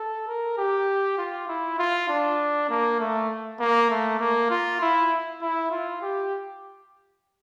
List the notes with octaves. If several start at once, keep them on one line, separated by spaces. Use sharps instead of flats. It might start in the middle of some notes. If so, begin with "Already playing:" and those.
Already playing: A4
A#4
G4
F4
E4
F4
D4
A#3
A3
A#3
A3
A#3
F4
E4
E4
F4
G4